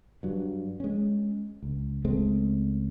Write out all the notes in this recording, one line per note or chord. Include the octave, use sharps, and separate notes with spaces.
G2 F#3
G#3 C#4
C#2
C#2 G#3 A3 C4